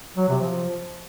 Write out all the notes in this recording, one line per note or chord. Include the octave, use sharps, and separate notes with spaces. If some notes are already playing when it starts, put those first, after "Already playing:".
F#3
C3
F3